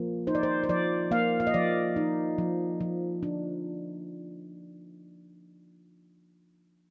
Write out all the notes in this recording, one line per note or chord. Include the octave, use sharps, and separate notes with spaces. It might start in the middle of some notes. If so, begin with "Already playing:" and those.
Already playing: F3 A#3
D#4 C5
D5
C5
C5
F3 D5
A#3 F5
F5
D#5
F3 D5
D#4
F3
F3
D4